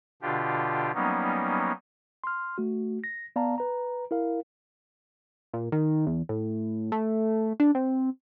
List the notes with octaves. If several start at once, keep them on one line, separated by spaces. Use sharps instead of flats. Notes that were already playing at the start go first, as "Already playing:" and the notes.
B2 D3 D4 F4 G4
F#3 G3 A#3 B3 C#4 D#4
C6 F6
A3 F#4
A#6
B3 D5 F5 A5 A#5
B4 A#5
E4 A#4 F5
A#2
D#3
E2
A2
A3
D4
C4